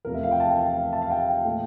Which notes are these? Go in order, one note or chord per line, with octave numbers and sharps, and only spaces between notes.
E2 C3 F3 A3 A#4
E5
F5
G5
A5
F5
E5
A5
F5
G5
A#2 A3